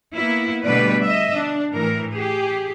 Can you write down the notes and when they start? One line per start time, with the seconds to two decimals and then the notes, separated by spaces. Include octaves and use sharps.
0.14 A#3 B3 E4
0.63 B2 D3 G3 A3 B4 D5
1.05 D#5 E5
1.34 D4
1.74 A2 E3 A#4
2.13 G4 G#4